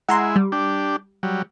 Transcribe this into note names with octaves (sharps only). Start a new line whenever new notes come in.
G#3 E4 F#5 A#5 C6
G3
D4 G4
F#3 G3